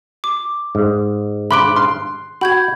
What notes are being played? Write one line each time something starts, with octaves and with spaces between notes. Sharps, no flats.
D6
G#2
B5 C6 D6 F#6 D7
C6 F6
F#4 B5 G6 G#6